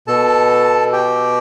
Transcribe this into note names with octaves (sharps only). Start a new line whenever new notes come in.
B2 A4 A5
G4 G5